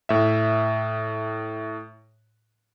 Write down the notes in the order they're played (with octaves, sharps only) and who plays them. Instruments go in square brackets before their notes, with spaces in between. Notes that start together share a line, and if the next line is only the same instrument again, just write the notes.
[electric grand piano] A2 E5